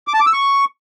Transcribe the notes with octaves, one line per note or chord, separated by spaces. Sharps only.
D6
A5
D6
E6
C#6